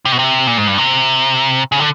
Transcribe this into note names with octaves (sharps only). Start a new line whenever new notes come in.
C3
B2
C3
A#2
G#2
G2
C3
C#3
D3